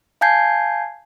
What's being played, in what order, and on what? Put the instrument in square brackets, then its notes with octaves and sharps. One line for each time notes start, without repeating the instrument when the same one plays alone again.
[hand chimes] F5 G#5 A5 G6 G#6 C7